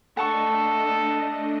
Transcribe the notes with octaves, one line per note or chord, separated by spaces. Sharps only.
A3 D4 A4 D#5 F#5 A5 C#6